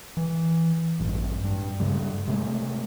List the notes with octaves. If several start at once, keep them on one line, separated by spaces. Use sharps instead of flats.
E3
A1 G2
G2
G2 C#3 G3
C3 G#3 A3